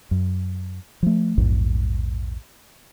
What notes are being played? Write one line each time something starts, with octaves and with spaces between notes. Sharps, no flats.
F#2
F3 A3
A#1 E2 G#2